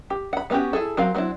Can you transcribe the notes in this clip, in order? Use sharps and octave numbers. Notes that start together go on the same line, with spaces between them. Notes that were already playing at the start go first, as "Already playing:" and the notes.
G4
F#5 B5
G3 B3 C#4 F#4 G4
E4 G#4 A4
F#3 C4 A#4 F5
F#3 B3 C4 D4 E4